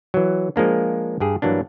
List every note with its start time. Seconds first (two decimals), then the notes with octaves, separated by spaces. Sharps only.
0.14 E3 F#3
0.56 F3 G#3 A#3 D4
1.20 G2 G4 G#4
1.42 G2 E3 F#3 A#3 D4